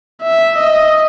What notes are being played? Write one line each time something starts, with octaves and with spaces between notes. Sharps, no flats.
E5
D#5